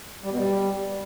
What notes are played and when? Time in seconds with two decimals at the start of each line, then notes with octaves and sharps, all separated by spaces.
0.24 G3
0.31 B2
0.38 G3